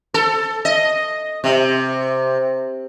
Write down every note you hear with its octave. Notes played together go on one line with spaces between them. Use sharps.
A4
D#5
C3